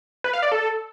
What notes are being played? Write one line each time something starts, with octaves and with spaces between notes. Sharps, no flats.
B4
F5
D5
A4